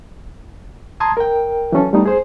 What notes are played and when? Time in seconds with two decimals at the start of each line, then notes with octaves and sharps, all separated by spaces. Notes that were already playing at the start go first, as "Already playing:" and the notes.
1.00 A5 A#5 C6 D#6 G#6
1.17 A#4 G5
1.72 E3 F#3 C#4 A4
1.93 G3 A3 B3 D#4
2.06 G#4 C5